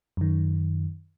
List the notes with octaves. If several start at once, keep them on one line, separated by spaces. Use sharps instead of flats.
F#2 D#3